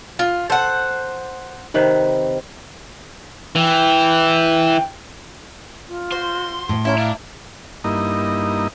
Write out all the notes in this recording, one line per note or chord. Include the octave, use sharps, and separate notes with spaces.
F4
A4 C5 F#5
C3 D#3 B4
E3 G5
F4
F#4 C5 C6
A2
C#4 E4 E5 A#5
D4 F5
G2 A#3 D#4 E4 D#5